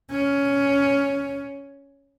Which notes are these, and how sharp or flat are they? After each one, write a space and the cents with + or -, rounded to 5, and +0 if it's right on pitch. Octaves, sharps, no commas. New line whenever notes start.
C#4 +10